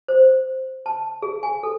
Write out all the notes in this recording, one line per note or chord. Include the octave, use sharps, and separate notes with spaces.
C5
A5
G#4
G#5
A4